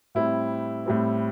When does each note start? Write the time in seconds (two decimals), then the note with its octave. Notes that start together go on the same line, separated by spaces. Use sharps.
0.15 A2 G3 C4 E4
0.86 A2 G3 C4